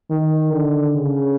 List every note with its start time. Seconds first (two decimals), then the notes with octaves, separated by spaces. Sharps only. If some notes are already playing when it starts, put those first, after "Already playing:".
0.10 D#3
0.53 D3
0.96 C#3